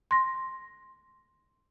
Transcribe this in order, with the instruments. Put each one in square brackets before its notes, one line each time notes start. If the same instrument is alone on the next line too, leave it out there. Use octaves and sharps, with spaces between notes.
[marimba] C6 A#6